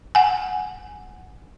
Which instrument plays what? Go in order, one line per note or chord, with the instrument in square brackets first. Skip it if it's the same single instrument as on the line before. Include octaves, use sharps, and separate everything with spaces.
[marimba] F#5 G#5